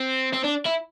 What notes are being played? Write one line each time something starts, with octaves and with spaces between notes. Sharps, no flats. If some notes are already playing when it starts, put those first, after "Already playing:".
Already playing: C4
C4
D4
E4